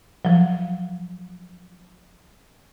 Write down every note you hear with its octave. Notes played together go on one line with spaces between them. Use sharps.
F3 F#3